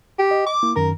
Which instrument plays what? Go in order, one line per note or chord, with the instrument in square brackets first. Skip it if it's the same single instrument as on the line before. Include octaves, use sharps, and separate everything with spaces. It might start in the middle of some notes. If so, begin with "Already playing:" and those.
[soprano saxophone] G4
[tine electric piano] D#5
[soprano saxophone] D6
[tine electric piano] A#3 E4
[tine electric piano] F#2 D#3 A#5 [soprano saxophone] A#4